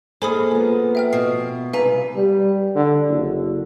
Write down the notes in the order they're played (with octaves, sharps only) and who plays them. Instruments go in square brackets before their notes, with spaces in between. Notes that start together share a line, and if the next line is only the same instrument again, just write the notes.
[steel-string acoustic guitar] G#2 [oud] A#3 A4 [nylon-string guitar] G#4 [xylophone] C5 B5 D#6
[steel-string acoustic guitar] F3 B3
[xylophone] E5 G5 F6
[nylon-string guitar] B2 [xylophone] C7
[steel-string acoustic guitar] G2 C3 [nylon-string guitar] B4 [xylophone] F5 G#5 A#5
[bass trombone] G3
D3
F#1